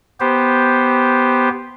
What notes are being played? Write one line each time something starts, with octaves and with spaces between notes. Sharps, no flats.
B3 G4 C5